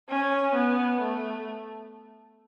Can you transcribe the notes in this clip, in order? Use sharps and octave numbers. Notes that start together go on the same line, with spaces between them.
C#4
B3
A3